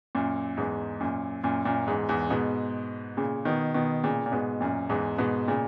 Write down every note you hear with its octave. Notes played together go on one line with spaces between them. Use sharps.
F#2 A#2
E2 G#2
F#2 A#2
F#2 A#2
F#2 A#2
E2 G#2
E2 G#2
G#2 B2
A#2 C#3
B2 D#3
B2 D#3
A#2 C#3
A#2
G#2 B2
F#2 A#2
E2 G#2
G#2 B2
A#2 C#3